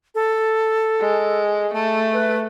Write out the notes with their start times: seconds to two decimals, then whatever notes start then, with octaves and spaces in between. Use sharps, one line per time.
0.15 A4
1.00 G#3
1.74 A3 A5
2.13 B4